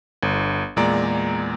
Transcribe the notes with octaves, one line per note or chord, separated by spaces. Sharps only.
G1
E2 A#2 G#3 D5 A#5